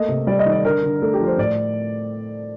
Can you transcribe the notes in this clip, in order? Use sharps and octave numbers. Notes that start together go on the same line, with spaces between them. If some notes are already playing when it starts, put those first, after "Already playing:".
Already playing: A3 A#3 D#5
C3
G3 D5
D#5
D#3
D5
D3 A#4
D3
A3 A4
G4
F3
C5
A2 D5